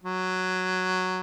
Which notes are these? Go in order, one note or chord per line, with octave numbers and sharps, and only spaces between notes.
F#3